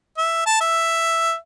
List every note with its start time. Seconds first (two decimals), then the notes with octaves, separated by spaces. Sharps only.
0.18 E5
0.46 A5
0.61 E5